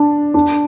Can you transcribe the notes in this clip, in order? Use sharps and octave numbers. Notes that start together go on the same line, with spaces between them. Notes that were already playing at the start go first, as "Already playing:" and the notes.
Already playing: D4
D4